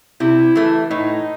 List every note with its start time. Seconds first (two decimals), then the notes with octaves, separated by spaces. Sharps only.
0.20 C3 E4
0.55 E3 A3
0.90 A2 D#4